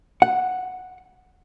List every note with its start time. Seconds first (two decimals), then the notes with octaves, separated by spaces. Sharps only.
0.22 F#5